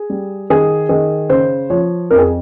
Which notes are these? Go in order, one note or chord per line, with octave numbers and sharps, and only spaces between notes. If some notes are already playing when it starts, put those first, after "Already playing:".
Already playing: G#4
G3
D#3 G#4
D#3 G#4
C#3 C5
F3 C#5
F2 A#4
G#4